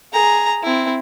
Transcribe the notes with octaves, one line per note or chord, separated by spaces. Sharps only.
G#4 A#5
C4 E4